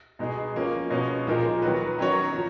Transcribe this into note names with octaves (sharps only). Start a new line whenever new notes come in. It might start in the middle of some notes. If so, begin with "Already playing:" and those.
B2 G#3 D#4 G#4
F3 A#3 C#4
B2 G#3 C#4
A#2 F3 G#3 D#4 A#4
D#3 F#3 B3 F#4 B4
D#3 F#3 C#4 F#4 C#5
F3